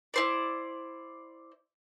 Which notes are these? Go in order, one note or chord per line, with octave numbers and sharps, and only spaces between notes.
E4 C5 D5